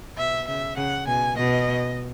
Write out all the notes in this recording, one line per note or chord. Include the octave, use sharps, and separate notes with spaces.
B2 E5
C#3 E5
C#3 F#5
B2 G#5
B2 D#5